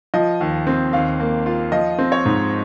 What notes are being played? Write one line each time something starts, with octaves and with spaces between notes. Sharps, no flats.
F3 D#5
D#2
C4
D#2 F5
A#3
F4
F3 D#5
C4
C#5
G#2